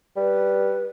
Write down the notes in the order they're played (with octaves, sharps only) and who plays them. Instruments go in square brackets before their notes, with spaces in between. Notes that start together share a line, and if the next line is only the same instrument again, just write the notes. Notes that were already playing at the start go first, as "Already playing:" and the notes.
[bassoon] G3 [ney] B4